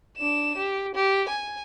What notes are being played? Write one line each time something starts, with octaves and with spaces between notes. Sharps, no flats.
D4 E7
G4
G4
G#5